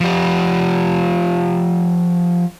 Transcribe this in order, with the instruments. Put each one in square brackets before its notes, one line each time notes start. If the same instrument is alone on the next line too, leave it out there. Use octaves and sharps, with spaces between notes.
[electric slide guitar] F3 G4